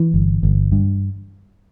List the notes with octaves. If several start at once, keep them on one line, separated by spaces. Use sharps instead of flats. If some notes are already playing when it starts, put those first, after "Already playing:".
Already playing: E3
G1
G1
G2